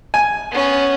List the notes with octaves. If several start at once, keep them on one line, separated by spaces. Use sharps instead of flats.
G#5
B3 C#4